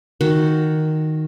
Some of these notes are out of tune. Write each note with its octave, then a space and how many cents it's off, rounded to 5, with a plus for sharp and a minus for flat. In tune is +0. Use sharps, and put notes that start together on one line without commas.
D#3 +0 F#4 +0